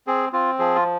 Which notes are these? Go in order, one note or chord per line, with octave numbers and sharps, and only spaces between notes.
C4 G#4
C4 F4
F3 G#4
F4